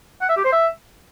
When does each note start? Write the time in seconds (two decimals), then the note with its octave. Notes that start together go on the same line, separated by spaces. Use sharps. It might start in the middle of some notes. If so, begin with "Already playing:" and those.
0.21 F#5
0.29 E5
0.37 G4
0.44 C5
0.52 E5